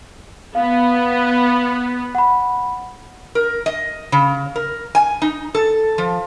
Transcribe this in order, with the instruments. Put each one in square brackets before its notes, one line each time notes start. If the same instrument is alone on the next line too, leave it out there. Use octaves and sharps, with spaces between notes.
[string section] B3 [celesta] F5
[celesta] F#5 B5
[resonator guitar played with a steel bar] A#4
D#5
C#3
A#4
G#5
D#4
A4
F3